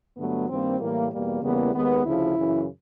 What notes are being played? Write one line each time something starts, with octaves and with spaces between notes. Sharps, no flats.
G2 D3 F#3 A3 B3
G2 D#3 G3 A#3 C4
A2 E3 G3 A#3
E2 B2 G3 A#3
E2 C#3 E3 G3 A#3 B3
D#2 D#3 G#3 B3
D2 C#3 F3 E4
F#2 C#3 E3